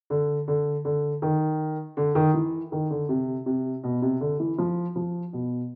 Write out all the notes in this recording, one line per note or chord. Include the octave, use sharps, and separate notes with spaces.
D3
D3
D3
D#3
D3
D#3
E3
D#3
D3
C3
C3
B2
C3
D3
E3
F3
F3
B2